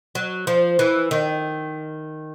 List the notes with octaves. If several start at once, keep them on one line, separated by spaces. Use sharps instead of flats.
F#3
F3
E3
D#3